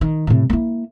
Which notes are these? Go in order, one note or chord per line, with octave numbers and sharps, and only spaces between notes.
D#3
A2 C3
A#3 E4